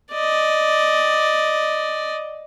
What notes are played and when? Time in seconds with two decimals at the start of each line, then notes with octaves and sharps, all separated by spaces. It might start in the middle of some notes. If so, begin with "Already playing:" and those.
0.12 D5 D#5